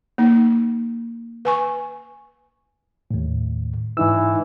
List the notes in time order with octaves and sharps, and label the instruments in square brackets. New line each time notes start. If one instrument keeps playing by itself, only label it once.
[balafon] A#3 D#4
B4 G#5 C#6
[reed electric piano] D#2 A2
[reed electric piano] G#2 D#4 E6 [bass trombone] E3